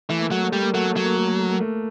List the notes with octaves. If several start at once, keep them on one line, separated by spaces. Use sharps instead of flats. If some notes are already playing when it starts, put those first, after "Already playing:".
E3 A3
A#3
F#3 A3
A#3
G3 A3
A#3
F#3 A3
A#3
F#3 A3
A#3
A3
A#3
A3
A#3
A3